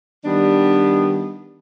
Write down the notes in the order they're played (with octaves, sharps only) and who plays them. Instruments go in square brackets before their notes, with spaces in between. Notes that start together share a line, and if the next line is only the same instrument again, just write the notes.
[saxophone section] D#3 G3 B3 D4